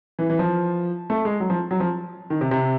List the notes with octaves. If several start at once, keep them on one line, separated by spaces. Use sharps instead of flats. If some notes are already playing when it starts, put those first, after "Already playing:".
E3
E3
F3
A3
G#3
F#3
F3
F#3
F3
D#3
C3
C3